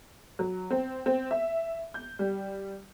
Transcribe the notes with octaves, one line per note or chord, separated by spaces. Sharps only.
F#3
C4
C4
E5
G6
G3